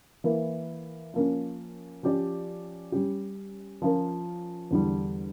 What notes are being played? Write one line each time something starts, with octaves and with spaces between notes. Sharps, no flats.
E3 A#3 E4
F3 A#3 C#4
F3 C#4 G4 D5
G3 C#4 G4
F3 C#4 F4 A#4
E2 D3 G3